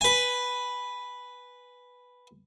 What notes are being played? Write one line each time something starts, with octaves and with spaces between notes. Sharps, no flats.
B4 G#5